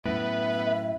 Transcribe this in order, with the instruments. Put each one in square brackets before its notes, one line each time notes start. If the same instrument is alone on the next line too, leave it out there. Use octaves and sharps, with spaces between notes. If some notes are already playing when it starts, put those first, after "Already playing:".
[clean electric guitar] F#2 A2 [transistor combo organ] B3 B4 [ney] E5